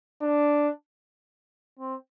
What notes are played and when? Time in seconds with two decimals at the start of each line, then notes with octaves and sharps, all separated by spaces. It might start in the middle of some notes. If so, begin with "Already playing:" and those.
0.21 D4
1.79 C4